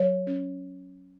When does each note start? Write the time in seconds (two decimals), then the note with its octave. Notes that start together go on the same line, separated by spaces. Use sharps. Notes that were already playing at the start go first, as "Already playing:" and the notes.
Already playing: F#3 C#5
0.27 C#4